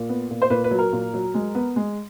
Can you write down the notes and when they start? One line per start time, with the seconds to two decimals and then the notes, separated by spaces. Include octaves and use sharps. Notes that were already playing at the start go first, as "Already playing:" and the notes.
Already playing: A#2
0.09 B3
0.30 A#2
0.42 C5
0.50 A#2 B4
0.64 B4
0.71 F#3
0.79 A#4
0.93 A#2
1.14 F#3
1.34 G#3
1.55 B3
1.76 G#3